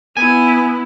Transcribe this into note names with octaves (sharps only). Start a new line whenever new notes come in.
B3 E4 G#5